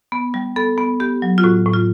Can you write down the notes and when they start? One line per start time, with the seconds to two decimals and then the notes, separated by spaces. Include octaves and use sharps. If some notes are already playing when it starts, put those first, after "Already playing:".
0.12 B3
0.34 G3
0.56 B3 A4
0.78 B3
1.00 B3 G4
1.22 F#3
1.38 F4
1.43 A2 F#4
1.66 A2
1.73 F4